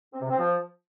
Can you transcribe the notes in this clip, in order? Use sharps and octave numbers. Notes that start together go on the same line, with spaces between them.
C4
C3
C4
F3